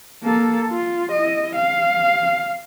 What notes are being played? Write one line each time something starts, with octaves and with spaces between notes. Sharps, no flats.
A#3 A4
F4
E4 D#5
F5